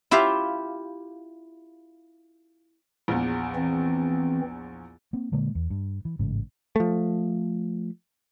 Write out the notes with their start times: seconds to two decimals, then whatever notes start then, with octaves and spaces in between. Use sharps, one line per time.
0.11 E4 F4 G4 E5 F5
3.08 A#1 E2
3.56 E3 C4
5.13 A#3 C4
5.32 A#2 D3 G#3 A#3
5.55 E2
5.70 G2
6.05 E3
6.19 A1 G#2 C#3
6.76 F3 A3